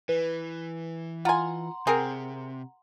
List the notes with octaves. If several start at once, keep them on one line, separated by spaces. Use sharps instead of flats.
E3 B4
F4 F#5 G#5 A#5 C6
C3 C4 G#4 A#4